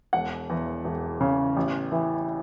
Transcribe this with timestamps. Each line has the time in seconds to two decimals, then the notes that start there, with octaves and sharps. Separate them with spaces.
0.13 E1 F#5
0.50 E2
0.84 E1
1.21 C#3
1.57 A1
1.92 E3